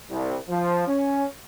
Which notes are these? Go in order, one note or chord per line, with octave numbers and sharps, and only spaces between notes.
C2
F3
C#4